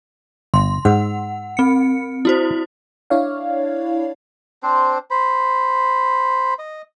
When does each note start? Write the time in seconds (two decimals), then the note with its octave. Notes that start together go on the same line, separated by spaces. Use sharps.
0.54 G1 C6
0.85 G#2 F#5
1.57 C4 C#7
2.25 E4 F#4 C5
3.10 D4 E4 C#5 D5 F5
4.63 C4 D4 C5
5.10 C5 B5
6.59 D#5